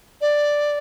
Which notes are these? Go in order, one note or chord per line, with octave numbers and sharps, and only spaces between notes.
D5